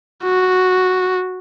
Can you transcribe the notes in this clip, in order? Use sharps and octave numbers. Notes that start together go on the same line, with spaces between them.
F#4